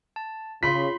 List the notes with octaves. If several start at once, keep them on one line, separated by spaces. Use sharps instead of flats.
A5
C#3 F4 B5 C6 B6